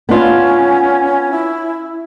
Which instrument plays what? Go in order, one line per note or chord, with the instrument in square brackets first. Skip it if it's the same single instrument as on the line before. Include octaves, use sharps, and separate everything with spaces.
[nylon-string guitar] B3 D4 F4 [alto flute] C#4
[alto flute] E4